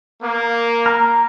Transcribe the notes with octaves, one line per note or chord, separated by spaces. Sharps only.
A#3
A#5 F6